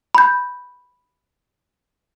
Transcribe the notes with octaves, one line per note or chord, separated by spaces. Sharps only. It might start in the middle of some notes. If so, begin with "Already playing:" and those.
B5 G6